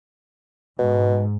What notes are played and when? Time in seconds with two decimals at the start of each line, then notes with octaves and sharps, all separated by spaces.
0.79 G#2 B2